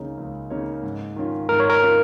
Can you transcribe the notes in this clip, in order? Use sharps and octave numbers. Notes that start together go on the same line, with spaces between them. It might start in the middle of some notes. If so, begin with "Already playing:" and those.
Already playing: C#2 C#3 A#3 D#4 C#5
C#2
C#3 A#3 D#4 C#5
G#2
D#3 C#4 F4
G#2 A#4
C#5
A#4
D#3 C#4 F4